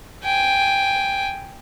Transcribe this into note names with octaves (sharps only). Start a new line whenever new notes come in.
G5 G#5